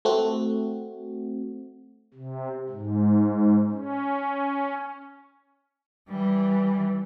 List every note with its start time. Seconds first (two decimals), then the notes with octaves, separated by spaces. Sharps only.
0.05 A3 C4 F#4
2.14 C3
2.69 G#2
3.70 C#4
6.09 E3 G3